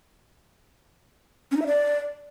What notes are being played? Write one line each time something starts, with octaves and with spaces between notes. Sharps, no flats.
C#4
D#4
E5
D5